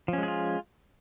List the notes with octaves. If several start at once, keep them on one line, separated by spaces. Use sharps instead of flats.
F3 G#3 C#4 F4 G#4